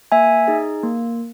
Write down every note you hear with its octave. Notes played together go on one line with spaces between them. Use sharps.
A#3 E5 G#5
D#4 G#4
A#3